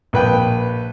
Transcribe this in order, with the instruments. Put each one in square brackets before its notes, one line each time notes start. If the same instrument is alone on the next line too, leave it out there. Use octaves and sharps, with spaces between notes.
[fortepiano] A#1 B4 G5